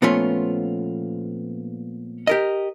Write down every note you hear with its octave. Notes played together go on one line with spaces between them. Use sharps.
A#2 F3 A3 B3 C#4 F4
G4 A#4 D#5